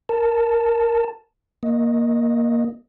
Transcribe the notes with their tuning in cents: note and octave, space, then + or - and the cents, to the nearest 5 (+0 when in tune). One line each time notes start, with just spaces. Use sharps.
A#4 +0 A5 +0
A#3 +10 D#5 +0